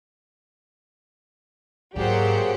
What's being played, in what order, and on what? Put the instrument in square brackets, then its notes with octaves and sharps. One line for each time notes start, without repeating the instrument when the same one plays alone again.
[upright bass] G#2 [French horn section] F#3 [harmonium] A#3 G#4 D5 [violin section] G4 C5 F#5